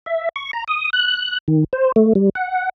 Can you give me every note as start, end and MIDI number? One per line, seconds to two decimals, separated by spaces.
0.06 0.29 76
0.36 0.51 85
0.53 0.64 82
0.68 0.90 87
0.93 1.38 90
1.48 1.64 51
1.73 1.92 72
1.96 2.13 57
2.15 2.29 55
2.35 2.69 78